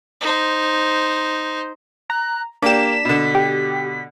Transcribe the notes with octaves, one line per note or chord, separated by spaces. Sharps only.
D#4 C5
A#5 F#6
A#3 D4 G4 B6 E7
B2 D3
G4